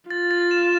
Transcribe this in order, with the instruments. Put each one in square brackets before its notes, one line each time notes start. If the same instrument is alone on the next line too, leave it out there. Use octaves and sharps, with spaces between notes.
[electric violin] F4 [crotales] A6
[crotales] A6
E7